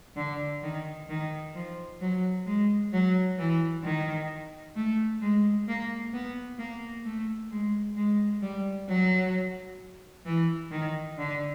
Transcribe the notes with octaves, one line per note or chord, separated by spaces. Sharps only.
D3
D#3
D#3
F3
F#3
G#3
F#3
E3
D#3
A3
G#3
A#3
B3
A#3
A3
G#3
G#3
G3
F#3
E3
D#3
D3